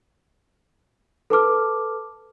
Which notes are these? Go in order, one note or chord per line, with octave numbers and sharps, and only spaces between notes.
A4 B4 A5 D6 F6